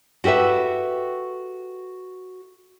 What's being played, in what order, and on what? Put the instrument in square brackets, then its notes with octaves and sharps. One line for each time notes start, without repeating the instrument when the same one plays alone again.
[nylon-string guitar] F#4 G4 A4 B4 E5